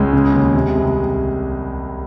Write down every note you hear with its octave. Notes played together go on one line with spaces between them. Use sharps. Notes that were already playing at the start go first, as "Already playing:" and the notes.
Already playing: C#2 G#3 G#4
C#3
D#2
C3
C2